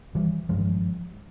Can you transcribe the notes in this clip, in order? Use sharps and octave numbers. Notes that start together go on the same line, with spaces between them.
E3 G3
G#1 G2 F3 G#3